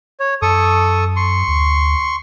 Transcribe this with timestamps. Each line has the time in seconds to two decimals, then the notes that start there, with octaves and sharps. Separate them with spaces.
0.20 C#5
0.42 F#2 A4 C#6 D#6
1.16 C6 C#6
1.48 D2